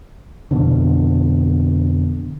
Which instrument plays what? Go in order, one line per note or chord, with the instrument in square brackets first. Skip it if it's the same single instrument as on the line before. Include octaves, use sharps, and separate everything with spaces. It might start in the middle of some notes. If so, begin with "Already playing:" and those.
[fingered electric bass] F2 B2 D3